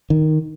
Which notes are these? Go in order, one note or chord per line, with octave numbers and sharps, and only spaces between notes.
D#3